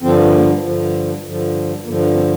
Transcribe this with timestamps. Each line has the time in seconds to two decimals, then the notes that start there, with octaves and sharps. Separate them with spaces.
0.02 G2 D3 F3 C4
0.32 A#3
0.63 G2 D3 F3
1.23 G2 D3 F3
1.84 G2 D3 F3 A#3
1.99 D4
2.15 C4